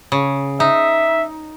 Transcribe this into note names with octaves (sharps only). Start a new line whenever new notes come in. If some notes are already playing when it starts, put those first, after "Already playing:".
C#3
D#4 E5